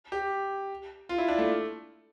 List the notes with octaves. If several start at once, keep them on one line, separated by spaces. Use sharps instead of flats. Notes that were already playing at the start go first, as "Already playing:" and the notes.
G4
F4
E4
D4
A3